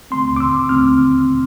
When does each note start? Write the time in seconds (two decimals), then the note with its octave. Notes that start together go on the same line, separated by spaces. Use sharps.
0.11 D3 A3 C4 C6
0.36 D6
0.40 E6
0.69 D3 A3 C4 F6